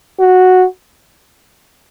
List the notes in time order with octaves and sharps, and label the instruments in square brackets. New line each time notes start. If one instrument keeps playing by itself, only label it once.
[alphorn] F#4